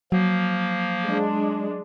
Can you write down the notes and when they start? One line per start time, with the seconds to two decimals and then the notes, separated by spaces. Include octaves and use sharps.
0.12 F3 F#3 A#3
1.06 G#3 D4